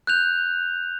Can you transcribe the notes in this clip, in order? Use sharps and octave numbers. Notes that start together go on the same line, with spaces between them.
F#6 G6 F7